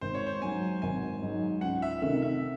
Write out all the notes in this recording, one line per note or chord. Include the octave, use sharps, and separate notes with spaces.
G#1 C5
C#5
C5
G#2 F#3 G#5
G#1 G#5
G#2 F#3
C#2 F#5
E5
C3 D#3 A3 E5
E5